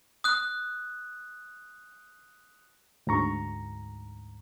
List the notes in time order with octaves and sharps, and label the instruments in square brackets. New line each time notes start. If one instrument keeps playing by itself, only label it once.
[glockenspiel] D#6 F#6
[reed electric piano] D2 G#2 A#5 C#6